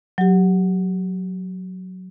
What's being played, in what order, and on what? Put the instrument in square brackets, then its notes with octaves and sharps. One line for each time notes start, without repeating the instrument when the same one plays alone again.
[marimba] F#3 G4